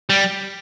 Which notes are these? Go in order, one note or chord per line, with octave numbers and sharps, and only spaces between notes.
G3